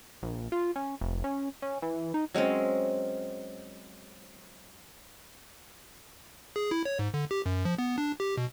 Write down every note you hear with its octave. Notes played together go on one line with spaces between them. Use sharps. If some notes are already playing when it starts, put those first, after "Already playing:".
A#1
F4
C#4
F1
C#4
C#4
E3
D#4
F#3 G#3 C4 C#4
G#4
E4
C#5
G#2
D3
G4
F#2
F3
B3
D4
G4
B2